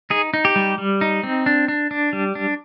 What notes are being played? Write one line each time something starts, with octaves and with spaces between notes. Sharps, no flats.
D#4 G#4
D#4
G4
G3
G3
D#4
C4
D4
D4
D4
G3
D4